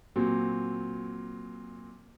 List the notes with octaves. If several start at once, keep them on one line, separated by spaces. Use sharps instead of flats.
A#2 F#3 C4